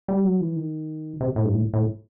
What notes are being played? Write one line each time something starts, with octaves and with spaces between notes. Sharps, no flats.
G3
F#3
E3
D#3
C3
A2
G2
A2
A2